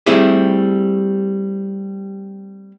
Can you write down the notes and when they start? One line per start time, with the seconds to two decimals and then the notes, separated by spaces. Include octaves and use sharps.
0.06 G3 A3 C4 E4 G4 G#4